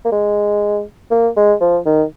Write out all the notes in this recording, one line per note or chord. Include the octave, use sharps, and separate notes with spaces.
A#3
G#3
A#3
G#3
F3
D#3